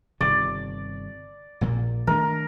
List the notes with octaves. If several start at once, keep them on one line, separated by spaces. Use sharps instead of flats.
G1 C3 D#3 D5
A#1 A#2 A#3
D#3 A3 D4 A#4